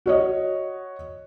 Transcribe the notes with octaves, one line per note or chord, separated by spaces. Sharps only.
F#4 C#5 D#5